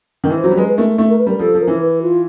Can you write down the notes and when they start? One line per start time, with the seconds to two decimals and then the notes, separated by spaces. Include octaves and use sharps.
0.24 D#3
0.30 E3
0.37 C5
0.44 F#3
0.51 G3
0.57 G#3 B4
0.68 B4
0.78 A3 A#4
0.98 A3
1.09 A#4
1.19 B4
1.26 G3 A#4
1.39 F3 A4
1.54 F3
1.61 A#4
1.67 E3
1.81 B4
2.02 F4